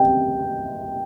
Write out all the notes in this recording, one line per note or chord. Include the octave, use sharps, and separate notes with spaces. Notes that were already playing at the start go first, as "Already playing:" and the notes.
Already playing: G5